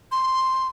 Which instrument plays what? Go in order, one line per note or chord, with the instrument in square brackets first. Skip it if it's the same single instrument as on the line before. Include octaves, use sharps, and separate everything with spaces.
[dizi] C6